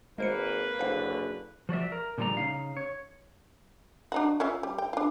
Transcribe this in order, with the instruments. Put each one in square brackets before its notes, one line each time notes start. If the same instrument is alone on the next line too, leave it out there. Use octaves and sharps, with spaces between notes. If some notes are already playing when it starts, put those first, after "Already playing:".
[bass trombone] G#1 [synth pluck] G#3 C5 C#7 [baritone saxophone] A#3 [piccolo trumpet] B4
[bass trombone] F#1 [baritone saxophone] D3 [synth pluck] C5 F5
[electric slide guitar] F3 F#4 D5 E5
A#4
A#2 D3 F3 G3 D5 A#5
C#3 D#4 F5
C#5
[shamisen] D4 D#4 F#4
C#4 F4 E5
G3
G5
D4 F4